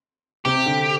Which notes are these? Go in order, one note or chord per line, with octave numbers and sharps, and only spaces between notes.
C3 G4
D3